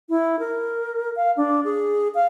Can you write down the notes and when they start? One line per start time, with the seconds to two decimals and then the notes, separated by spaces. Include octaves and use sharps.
0.09 E4
0.39 A#4
1.16 F5
1.37 D4
1.64 G#4
2.15 F5